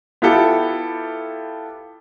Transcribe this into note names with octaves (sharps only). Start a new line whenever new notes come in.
B3 E4 F4 G4 A4